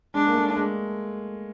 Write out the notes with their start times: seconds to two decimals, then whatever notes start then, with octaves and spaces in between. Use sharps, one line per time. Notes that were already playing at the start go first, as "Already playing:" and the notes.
0.14 G#3 D4
0.27 A#3
0.35 A3
0.56 G#3